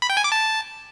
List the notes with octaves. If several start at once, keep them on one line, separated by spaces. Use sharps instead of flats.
B5
G5
G#5
D6
A5